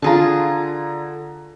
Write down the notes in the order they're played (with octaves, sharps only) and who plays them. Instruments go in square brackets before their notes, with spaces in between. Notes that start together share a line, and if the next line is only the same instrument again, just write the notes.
[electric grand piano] D3 A#5 [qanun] F4 G#4 A5